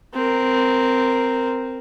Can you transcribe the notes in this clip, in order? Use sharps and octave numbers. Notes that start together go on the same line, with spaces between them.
C4 A#4